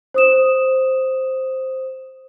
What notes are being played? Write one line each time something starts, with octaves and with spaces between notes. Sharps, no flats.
C5 D#6 E7